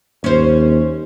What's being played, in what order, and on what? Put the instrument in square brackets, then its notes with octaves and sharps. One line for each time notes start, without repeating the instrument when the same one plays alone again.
[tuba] D#2 [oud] C#4 C5